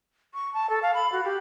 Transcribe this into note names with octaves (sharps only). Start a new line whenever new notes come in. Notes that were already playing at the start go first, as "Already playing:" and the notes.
C#6
A5
A4
F5
B5
F#4
G4